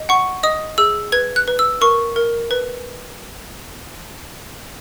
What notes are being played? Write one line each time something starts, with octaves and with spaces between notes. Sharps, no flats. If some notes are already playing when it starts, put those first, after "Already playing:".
Already playing: D#5
F#5 C#6
D#5 D#6
G#4 E6
B4 G#6
F#6
B4
E6
A#4 C#6
A#4
B4